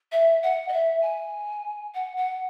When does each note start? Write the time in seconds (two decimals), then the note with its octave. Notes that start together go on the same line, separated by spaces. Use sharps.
0.12 E5
0.43 F#5
0.69 D#5
0.73 E5
1.02 G#5
1.94 F#5
2.17 F#5